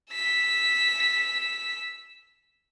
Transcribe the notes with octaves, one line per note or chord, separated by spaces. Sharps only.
E6 B6